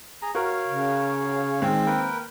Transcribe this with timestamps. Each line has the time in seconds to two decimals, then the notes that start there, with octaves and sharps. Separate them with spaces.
0.22 G#4 A#5
0.35 F#4 A#4 C#5 F5
0.68 C#3
1.62 D#3 G#3 C4
1.86 A#3 A#4 B4 G5